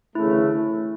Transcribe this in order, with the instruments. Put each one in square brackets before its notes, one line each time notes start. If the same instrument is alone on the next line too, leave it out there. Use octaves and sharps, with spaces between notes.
[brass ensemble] D2 C#3 E3 A3 [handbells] E4